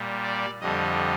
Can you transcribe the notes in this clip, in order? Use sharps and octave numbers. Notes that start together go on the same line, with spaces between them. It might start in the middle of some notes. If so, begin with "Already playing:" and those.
Already playing: A#2 G3
D5
F2 D3 G3 D#5